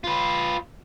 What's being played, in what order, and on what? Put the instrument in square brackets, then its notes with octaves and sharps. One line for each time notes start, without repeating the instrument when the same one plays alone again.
[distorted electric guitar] F4 B4